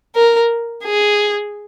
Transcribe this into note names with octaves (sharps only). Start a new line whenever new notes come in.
A#4
G#4